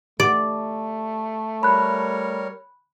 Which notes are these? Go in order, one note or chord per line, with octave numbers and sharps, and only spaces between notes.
A3 G4 D5
G3 A#4 C#5 B5 F#6